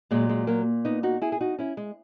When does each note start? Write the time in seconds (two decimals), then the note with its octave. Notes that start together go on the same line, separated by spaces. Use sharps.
0.11 A#2 F#3 G#3
0.29 G#3
0.47 F#3 A#3
0.85 B3 D#4
1.03 D#4 F#4
1.22 E4 G#4
1.32 G#4
1.40 D#4 F#4
1.59 C#4 E4
1.77 G#3